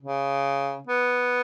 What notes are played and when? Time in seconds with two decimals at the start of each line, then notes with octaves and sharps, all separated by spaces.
0.02 C#3
0.87 B3